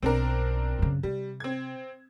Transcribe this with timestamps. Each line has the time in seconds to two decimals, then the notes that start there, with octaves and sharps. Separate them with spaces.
0.03 B1 C4 D4 A#4
0.79 F#2 C#3
1.03 C3 G3
1.40 C4 G#6